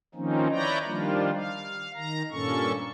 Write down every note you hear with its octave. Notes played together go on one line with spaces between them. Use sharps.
D#3 F3 A#3 C4 C#4 D#4
E4 B4 C#5 D5 G5 A#5
D#3 F3 G3 A#3 D4 F4
F5
D#3 A#5
G2 A#2 A#3 C#4 A4 C#6